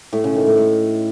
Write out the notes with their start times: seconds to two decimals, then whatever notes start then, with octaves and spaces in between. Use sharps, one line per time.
0.13 A2
0.24 C#3
0.35 D#3
0.46 A2
0.58 A2